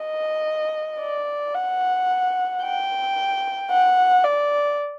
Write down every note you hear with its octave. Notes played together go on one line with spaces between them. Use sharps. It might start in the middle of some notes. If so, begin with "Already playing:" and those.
Already playing: D#5
D5
F#5
G5
F#5
D5